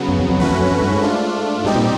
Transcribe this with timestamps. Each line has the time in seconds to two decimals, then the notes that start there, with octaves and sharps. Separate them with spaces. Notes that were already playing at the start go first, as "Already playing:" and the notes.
Already playing: C#3 F#3 B3
0.08 F#2
0.19 F2
0.29 F2
0.40 E2 A3 C#4 F#4 B4
0.51 F2
0.61 F#2
0.71 F2
0.82 G2
0.91 G#2
1.02 A3 D4 F4
1.64 G#2 B2 G3 C4 D#4 G4
1.76 A#2